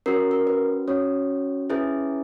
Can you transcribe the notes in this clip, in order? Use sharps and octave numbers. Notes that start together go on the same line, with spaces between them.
C#4 F#4 A#4
A#4
B4
C#4 F#4 C#5
C#4 E4 G#4 B4